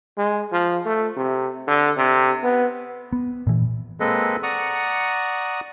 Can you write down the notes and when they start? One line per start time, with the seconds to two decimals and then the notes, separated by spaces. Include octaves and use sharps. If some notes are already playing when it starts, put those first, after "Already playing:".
0.17 G#3
0.52 F3
0.86 A3
1.17 C3
1.67 D3
1.97 C3
2.43 B3
3.13 B3
3.47 A#2 E3
4.00 G#3 A#3 C4 A4 B4 D#5
4.43 D5 F#5 A#5 C#6 D#6